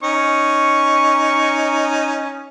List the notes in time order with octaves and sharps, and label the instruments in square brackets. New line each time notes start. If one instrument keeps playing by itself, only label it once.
[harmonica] C#4 D#4 [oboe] C#6